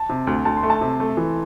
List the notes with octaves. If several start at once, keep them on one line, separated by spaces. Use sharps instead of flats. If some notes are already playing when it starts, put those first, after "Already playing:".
Already playing: A5
C3
D2
D2 A5
C6
A3
A5
C3
A3
E3